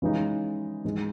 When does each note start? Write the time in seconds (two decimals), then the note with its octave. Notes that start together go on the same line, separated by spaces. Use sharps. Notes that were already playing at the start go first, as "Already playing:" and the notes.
0.02 C#3 E3 G#3 D#4
0.84 G#2 E3 G#3